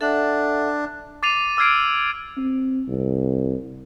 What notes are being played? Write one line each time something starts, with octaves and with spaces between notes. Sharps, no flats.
D4 A4 E5 F#5
D6 A6 C7 D#7 F7
D6 E6 F6 G#6 C7 D7
C4
C2